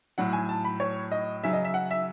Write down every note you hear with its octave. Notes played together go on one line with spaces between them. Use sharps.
A2 F#3 F#5
G#5
A5
B5
C#5
D#5
C#3 F#3 E5
D#5
E5
F#5
E5